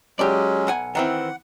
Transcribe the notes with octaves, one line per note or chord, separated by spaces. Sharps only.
F#3 G#3 C#4 G4 D5
B1 F#5 G#5
D#3 E3 C4 F#5